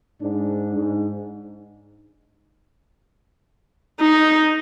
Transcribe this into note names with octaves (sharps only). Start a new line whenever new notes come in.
G#2 D4
G#2
D#4